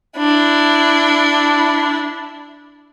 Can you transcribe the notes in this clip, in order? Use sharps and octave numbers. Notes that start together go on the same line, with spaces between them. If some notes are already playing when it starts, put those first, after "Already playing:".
D4 E4